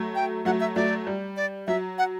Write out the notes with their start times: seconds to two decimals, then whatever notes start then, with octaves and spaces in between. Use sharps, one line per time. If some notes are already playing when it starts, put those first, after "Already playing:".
Already playing: F#3 A3
0.15 G5
0.45 F#3 A3 F#5
0.60 E5
0.75 F#3 A3 D5
1.07 G3
1.37 D5
1.67 F#3 E5
1.98 F#5